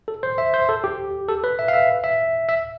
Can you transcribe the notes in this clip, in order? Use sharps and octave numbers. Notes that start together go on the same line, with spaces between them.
A4
C5
E5
C5
A4
G4
A4
B4
E5
F5
E5
E5
E5